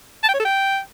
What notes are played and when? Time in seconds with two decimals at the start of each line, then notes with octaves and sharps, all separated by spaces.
0.23 A5
0.29 G5
0.34 C#5
0.39 A4
0.45 G5